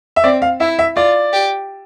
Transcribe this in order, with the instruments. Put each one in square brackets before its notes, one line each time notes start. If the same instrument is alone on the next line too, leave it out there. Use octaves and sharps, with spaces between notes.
[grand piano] E5
[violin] C4 [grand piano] D5
[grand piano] F5
[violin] E4 [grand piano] E5
[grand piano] E5
[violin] F4 [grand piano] D5
[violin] G4